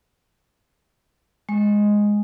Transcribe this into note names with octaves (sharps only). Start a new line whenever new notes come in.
G#3